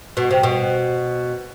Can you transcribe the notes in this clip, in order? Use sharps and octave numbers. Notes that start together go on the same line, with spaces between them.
B2
C3
B2